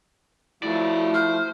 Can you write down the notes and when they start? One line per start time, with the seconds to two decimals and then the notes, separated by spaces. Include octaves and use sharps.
0.63 F3 F#3 A3 E4 D5
1.14 C5 F6